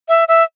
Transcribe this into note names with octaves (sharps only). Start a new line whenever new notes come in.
E5
E5